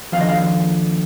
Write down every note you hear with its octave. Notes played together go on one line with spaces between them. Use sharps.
D#2 D3 F3 F5
D#5
F5